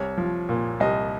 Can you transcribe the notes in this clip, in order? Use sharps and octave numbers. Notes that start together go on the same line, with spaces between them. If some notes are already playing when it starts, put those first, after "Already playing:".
Already playing: C2 C#5
F3
A#2
C2 D#5